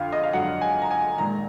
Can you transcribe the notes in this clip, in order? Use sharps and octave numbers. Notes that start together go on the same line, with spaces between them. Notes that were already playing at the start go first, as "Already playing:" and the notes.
Already playing: F2 D3 F5
D#5
F5
F2 D3 F#3 F#5
G#5
A#5
G#5
A#1 G#2 D#3 G#3 A#5